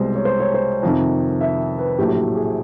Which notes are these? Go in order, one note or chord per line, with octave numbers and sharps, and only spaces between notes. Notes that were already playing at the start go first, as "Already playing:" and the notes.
Already playing: C2 B2 G#3 C5
C#5
C5
C#5
C5
F2 C3 D#3
E5
B4
A#1 A2 F#3 A3 G4
G#4